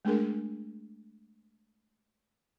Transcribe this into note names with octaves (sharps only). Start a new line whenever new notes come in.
G#3 A3 D4 G#4 A#4